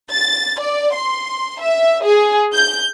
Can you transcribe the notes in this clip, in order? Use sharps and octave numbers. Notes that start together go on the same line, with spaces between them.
A6
D5
C6
E5
G#4
G6